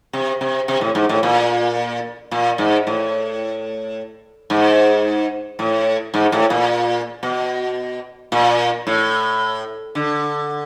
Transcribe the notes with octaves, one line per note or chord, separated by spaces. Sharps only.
C3
C3
C3
A2
G#2
A2
A#2
A#2
G#2
A2
G#2
A2
G#2
A2
A#2
B2
A#2
A2
D3